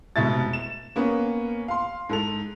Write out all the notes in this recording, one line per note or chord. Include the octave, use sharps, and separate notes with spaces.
F1 G#2 B2 E5 A6
E7
A#3 B3 C#4
F5 C6
G#2 A4 F7